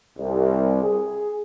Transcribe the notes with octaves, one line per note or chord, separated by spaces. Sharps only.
C2
G#4